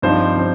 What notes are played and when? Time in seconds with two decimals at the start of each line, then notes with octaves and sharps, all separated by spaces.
0.02 G2 F3 C4 D#4 C5
0.37 F3 C4